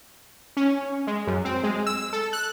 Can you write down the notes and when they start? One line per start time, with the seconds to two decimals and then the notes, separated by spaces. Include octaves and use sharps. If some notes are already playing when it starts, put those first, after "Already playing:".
0.57 C#4
1.07 G#3
1.27 F#2
1.45 C4
1.64 G#3
1.87 E6
2.13 A4
2.33 F#6